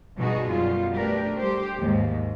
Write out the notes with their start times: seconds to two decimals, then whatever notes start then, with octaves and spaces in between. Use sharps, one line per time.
0.19 G2 B2 D#4 F#4 G#4
0.51 F#2 B2 G3 F4
0.95 A3 D4 G4 A#4 B4
1.36 G3 A3 G4 C5
1.78 D#2 G#2